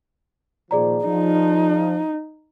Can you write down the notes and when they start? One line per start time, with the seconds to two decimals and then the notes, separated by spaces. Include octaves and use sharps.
0.71 A#2 D#3 F3 G#4 D5 A#5
1.05 F3 D#4